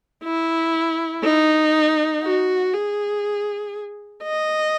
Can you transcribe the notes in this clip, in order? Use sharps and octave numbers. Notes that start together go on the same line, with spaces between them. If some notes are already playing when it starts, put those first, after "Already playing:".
E4
D#4
F#4
G#4
D#5